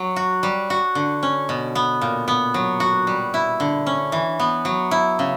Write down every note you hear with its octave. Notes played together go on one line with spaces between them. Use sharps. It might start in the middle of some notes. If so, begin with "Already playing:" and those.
Already playing: F#3
F#4
G3
F#4
D3
C#4
B2
B3
A#2
B3
F#3
F#4
G3
E4
D3
C#4
E3
B3
F#3
E4
C#3